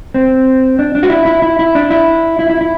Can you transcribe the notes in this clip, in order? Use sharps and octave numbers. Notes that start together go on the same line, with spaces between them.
C4
D4
D4
F#4
E4
E4
E4
E4
D4
E4
E4
E4
E4